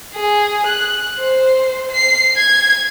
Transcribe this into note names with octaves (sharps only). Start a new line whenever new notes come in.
G#4
F#6
C5
C7
G#6